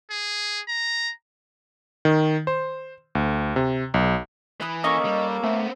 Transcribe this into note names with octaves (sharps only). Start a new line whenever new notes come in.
G#4
A#5
D#3
C5
D2
C3
B1
E3 B4 D#6
A#3 C#4 A4 D#5 C#6
G3
A3 B3 C4